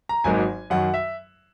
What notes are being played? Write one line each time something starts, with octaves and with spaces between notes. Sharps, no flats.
A#5
G#1 G#2 F#3 A#3 D#4 G#5
F#2 D#3 F#3 F#5
E5